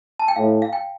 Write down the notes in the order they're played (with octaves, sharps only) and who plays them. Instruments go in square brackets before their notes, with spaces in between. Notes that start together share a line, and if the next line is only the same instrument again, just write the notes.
[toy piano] A5
G5
[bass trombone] A2 [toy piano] F5
[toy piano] F5
G5